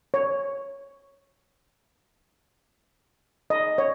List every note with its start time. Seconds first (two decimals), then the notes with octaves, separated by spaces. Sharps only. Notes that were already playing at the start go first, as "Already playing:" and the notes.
0.14 C#5
3.50 D#5
3.78 C#5